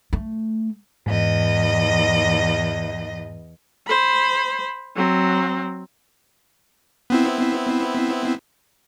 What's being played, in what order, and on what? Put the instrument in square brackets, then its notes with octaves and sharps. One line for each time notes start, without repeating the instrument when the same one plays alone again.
[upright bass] A3
[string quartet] E2 D#5 [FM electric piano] G#2
[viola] C5 B5
F#3 C4
[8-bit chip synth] B3 C4 E4